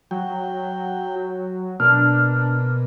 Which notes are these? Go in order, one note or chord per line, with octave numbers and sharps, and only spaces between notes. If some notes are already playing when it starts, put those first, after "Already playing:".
F#3 F#4 G5
B2 A#3 D4 F6